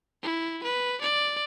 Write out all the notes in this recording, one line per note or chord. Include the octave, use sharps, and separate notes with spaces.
E4
B4
D5